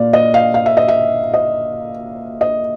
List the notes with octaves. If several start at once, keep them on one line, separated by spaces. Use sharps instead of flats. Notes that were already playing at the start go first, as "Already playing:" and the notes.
Already playing: A#2 D5 F5
D#5
F5
F5
E5
D#5
E5
D#5
D#5